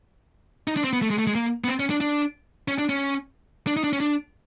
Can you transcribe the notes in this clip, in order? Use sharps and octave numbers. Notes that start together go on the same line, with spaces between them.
D#4
D4
C4
B3
A3
G#3
A3
G#3
A#3
B3
C4
C#4
D4
D4
C#4
D4
C#4
D4
D#4
D4
C#4
D4